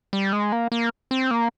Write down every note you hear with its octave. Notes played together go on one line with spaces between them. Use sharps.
G3
G#3
A#3
A#3
C4
A#3